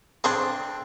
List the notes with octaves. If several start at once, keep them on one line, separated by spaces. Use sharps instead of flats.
C4 D4 G#4 A4 C5